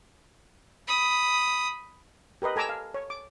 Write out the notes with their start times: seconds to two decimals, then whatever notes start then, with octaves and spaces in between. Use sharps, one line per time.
0.88 B5 D#6
2.42 G4 A#4 B4 D#5
2.56 A4 G#5 A#5 D6 E6
2.69 F5
2.94 C#5
3.10 D6